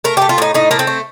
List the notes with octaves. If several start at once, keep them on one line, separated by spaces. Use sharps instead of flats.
A3 A#4
G4
A3
F4
A2 D#4
A2 D#4
A3 A#3
C4
A3